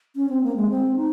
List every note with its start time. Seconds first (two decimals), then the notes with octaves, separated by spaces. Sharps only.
0.16 C#4
0.29 C4
0.43 A#3
0.56 G#3
0.70 C4
0.97 D#4